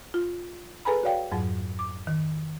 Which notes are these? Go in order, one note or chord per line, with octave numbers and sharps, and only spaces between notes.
F4
G#4 A4 B4 G#5 A#5 B5
F#4 C#5 D5 F5 G5
F2 G#2 F#3
D6
D#3